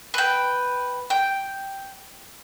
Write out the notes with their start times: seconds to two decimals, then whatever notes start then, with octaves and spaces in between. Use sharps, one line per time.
0.14 B4 G5
1.10 G5